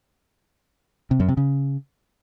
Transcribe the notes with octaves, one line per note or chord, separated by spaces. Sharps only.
C3
F#2
C3
C#3